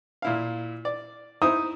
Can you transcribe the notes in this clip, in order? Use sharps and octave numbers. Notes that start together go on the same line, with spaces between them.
A#2 E4 F5
D5
D#4 E4 C5 D#6